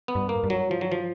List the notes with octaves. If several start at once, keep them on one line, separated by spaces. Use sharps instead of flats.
B3
G2
A#3
G2
F#3
F3
F#3
F3